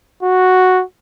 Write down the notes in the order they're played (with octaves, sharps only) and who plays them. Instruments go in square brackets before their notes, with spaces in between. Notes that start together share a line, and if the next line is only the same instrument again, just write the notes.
[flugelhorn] F#4